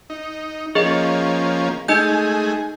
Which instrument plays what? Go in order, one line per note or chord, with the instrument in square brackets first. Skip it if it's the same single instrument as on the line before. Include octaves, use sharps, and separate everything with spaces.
[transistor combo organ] D#4
[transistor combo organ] F3 A#3 C#4 [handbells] G#4 D#5
[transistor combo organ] G#3 A3 G#4 [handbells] D#4 D#5 G6